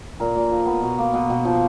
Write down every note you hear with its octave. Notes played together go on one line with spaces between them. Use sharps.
A#2 A#4
A#2
F3
B3
B2
A#3
B2
B2
F3